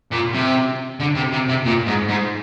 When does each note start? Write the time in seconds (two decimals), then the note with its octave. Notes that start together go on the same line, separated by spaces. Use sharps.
0.11 A#2
0.33 C3
1.00 D3
1.15 C3
1.32 C3
1.48 C3
1.65 A#2
1.86 G#2
2.09 G#2